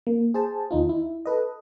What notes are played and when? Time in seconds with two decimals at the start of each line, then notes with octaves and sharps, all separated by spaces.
0.07 A#3
0.34 G#4 C5 A5
0.71 D#2 D#4 F4
0.89 E4
1.26 A4 B4 D#5